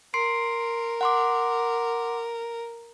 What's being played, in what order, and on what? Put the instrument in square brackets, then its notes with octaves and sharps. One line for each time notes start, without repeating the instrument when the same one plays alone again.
[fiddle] A#4 [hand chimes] C6 C7 D7
[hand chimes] F#5 C6 D6